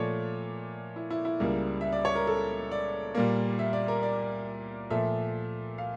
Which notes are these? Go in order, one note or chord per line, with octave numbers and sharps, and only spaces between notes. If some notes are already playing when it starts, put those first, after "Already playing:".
Already playing: A#2 F3 A3 C#5 D5
E4
E4
E4
C#2 C#3 G3 A#3
E5
D5
C#5
A#4
A4
D5
A#2 G3 A#3
E5
D5
A#4
D5
A#2 F3 A3 E5
F5